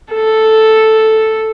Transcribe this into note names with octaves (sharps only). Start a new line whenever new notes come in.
A4